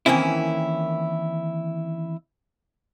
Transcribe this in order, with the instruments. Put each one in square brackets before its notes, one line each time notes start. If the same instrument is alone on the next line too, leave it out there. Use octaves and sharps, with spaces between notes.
[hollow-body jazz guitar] D#3 E3 A#3 C4 C#4 E4